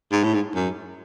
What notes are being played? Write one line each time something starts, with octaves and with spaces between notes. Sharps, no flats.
G#2
A2
G#2
F#2